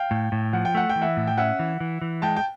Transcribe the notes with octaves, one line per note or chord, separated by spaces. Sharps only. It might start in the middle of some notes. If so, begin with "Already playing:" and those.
Already playing: F5 G5
A2
A2
F3 F#5
G5
A3 F#5
G5
E3
E5 F#5
A2
G5
C#4 E5 F#5
E3
E3
E3
G#3 G5 A5
G5